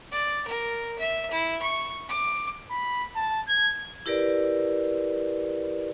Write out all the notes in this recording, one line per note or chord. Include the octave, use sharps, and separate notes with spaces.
D5
A#4
E5
E4
C#6
D6
B5
A5
G#6
E4 G4 A#4 B4 D5